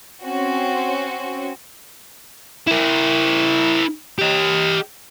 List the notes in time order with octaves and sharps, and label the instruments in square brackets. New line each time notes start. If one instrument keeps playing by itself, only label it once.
[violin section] C4 C#4 F#4
[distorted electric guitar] E4 A#4
G4 D#5